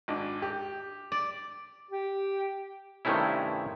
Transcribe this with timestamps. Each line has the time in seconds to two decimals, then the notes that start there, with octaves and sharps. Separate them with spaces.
0.08 G#1 D4
0.42 G4
1.12 D5
1.91 G4
3.05 G2 C3 D#3 A3 C#4 E4